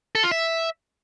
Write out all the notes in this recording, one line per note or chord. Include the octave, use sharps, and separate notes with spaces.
A4
F4
E5